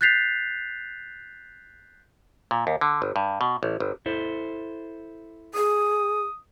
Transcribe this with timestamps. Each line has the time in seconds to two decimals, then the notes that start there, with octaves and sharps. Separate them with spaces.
0.01 F#6 G6 A6 B6 C7 F7
2.51 A#2
2.67 D#2
2.81 D3
3.02 G1
3.16 G2
3.41 B2
3.63 A1
3.80 G1
4.06 E4 A4 C5
5.54 G#4 D#6